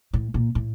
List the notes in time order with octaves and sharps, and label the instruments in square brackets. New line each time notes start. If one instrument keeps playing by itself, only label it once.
[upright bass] A2
A#2
A2